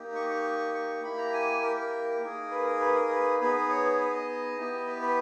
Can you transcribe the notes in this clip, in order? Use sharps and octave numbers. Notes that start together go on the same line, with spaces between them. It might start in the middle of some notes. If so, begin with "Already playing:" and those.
Already playing: A#3 D#4 G4
C#6
C#6
C#6
A#3 E4 G4 B5
A#5
G#5
A#4
A#4
A#3 D#4 G#4
B4
A#4
B4
A#4
B4
B3 D#4 G#4 B4
C#5
B4
D#5
B3 E4 G4
B4
B4